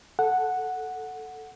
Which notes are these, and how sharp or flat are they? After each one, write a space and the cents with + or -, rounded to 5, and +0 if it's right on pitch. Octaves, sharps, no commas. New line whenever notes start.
A4 +0 F#5 -5